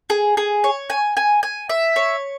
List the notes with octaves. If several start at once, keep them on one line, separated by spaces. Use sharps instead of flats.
G#4
G#4
C#5
G#5
G#5
G#5
E5
C#5